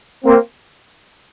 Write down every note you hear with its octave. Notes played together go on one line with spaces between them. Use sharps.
A#3 C4